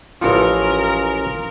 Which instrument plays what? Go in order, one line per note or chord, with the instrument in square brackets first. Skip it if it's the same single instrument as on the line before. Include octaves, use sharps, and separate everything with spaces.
[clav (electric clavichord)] A1 E3 F3 [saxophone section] C#4 [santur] F4 D#6 [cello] A#4